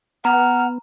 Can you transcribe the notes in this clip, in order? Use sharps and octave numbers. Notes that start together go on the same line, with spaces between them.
B3 F#5 A#5 F6